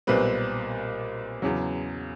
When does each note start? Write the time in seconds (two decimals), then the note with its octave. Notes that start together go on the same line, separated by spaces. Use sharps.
0.07 B1 A#2 G3 C4 B4
1.42 E2 C#3 F#3